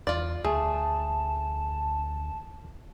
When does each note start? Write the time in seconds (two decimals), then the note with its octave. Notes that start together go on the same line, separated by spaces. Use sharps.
0.07 E2 F4 D5
0.45 D2 A3 G#4 A5